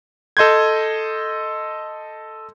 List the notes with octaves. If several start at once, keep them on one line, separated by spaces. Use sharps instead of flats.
A4 D#5 C6 G6 G#6